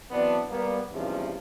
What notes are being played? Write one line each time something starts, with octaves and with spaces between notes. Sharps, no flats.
E3 F#3 B3 C4 D4
G3 A#3 B3
B1 E2 G2 C3 F3 C#4